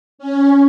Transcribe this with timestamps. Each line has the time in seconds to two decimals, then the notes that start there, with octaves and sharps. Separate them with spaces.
0.18 C#4